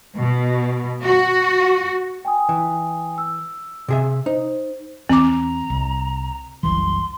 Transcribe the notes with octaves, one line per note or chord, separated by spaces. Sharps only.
B2
F#4
G5 G#5 D#6
E3
E6
C3 G#4 E5
D#4 C5
E2 C4 A#5 D6
C2
F#1 C2 E3 C6